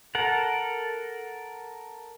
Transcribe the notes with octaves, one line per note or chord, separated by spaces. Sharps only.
A4 A#4 F#5